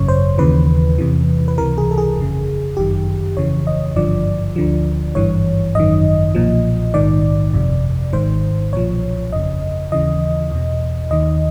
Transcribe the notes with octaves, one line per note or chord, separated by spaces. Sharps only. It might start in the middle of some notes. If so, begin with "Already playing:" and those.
Already playing: G#1 F#2 C#3 C#5
C5
D#2 C#3 E3 B4
E2 C3 E3
B4
C#2 C3 E3 A#4
G#4
A4
G#4
G1 F2 C#3
G1 F#2 D#3 G4
G1 F2 C#3 E3 C#5
D#5
G#1 G2 D3 F3 D5
D2 D3 F3
G#1 G2 E3 C#5
G#1 F#2 D#3 D#5
B1 A#2 F3
A#1 G#2 D#3 D5
G1 F2 C3
G#1 G#2 D#3 C5
B1 A#2 F3 C#5
G1 F2 C#3 D#5
D#2 C#3 E3 D#5
E2 B2
D#2 D#3 D#5